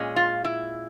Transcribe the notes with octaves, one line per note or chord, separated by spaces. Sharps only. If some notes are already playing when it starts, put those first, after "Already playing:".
Already playing: A#2 G#3 C#4
F4
E4